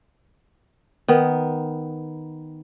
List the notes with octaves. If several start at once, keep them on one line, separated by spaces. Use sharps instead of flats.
D#3 B3